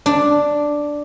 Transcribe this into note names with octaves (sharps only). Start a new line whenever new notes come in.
D4